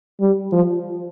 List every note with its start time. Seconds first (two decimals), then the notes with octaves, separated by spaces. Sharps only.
0.20 G3
0.52 F3